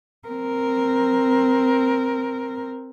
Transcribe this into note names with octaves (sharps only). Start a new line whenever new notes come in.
C4 A#4